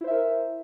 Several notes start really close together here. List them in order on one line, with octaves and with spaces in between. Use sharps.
E4 C5 E5 A#4